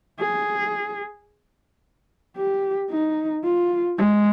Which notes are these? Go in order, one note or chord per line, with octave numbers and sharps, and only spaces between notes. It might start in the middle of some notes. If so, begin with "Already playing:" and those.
G#4
G4
D#4
F4
G#3